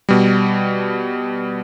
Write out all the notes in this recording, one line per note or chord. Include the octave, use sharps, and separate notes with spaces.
B2 G3